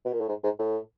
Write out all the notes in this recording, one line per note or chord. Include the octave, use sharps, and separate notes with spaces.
B2
A#2
A2
G#2
G#2
A2